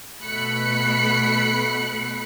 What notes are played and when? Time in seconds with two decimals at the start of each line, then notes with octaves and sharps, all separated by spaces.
0.22 B2 A3 B5 F#6 C#7